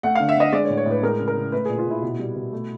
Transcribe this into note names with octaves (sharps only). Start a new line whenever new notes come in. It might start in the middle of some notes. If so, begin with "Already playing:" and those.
A3 F#5
D3 F5
E5
D3 D#5
G#3 D5
C#5
A2
C#5
A2 B4
G#3 A#4
C#3
A#4
C#3
A3 B4
A#2 G#4
F4
A#2 E4
B2
G3
B2
A3